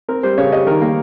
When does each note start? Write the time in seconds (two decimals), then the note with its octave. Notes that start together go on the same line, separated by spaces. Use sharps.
0.08 C4 A#4
0.23 G3 C5
0.38 C#3 C#5
0.52 G3 D#5
0.67 D#3 A#4
0.82 A#3